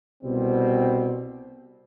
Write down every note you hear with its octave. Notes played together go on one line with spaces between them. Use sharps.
C2 B2 G3 C4